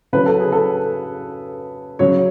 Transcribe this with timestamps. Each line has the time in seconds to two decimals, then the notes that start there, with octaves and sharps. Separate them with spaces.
0.13 C#3 F#3 B4
0.26 A4
0.40 G#4
0.52 A4
1.99 C#3 F#3 C#5